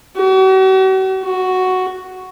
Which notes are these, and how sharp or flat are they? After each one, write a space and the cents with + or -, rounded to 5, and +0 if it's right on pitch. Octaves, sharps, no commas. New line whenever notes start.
F#4 +45
F#4 +0